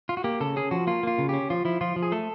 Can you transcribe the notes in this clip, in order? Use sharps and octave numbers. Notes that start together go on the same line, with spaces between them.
F4
F#4
A#3 G4
C#3 A4
C#4 G#4
F3 F#4
A#3 F4
A#3 F4
C#3
C#4 G4
F3 F4
F3 E4
F3 F4
F3
G#4
A3 A4